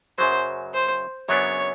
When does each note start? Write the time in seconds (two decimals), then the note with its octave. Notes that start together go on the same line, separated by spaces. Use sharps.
0.18 F#2 C#3 F#3 C5
0.74 C5
1.29 F#2 C#3 F#3 B3 D4 C#5